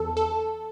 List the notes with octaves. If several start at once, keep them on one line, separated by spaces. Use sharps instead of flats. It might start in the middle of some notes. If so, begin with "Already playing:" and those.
Already playing: E2 A4
A4